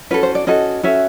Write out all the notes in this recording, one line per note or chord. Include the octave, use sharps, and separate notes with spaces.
C#4 F#4 A4 B4
C5
D5
C#4 F#4 A4 D#5
C#4 F#4 A4 E5